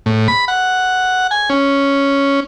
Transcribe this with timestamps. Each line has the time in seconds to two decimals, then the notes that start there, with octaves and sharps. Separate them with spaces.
0.06 A2
0.28 B5
0.48 F#5
1.31 G#5
1.50 C#4